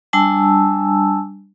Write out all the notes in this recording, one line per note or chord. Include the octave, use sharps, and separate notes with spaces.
G3 D4 G#5 A5 E6